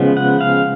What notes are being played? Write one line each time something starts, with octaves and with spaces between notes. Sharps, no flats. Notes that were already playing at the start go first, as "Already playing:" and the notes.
Already playing: C#3 F3 G#3 B3
F#5
F5